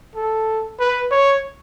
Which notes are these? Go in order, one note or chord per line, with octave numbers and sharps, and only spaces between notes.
A4
B4
C#5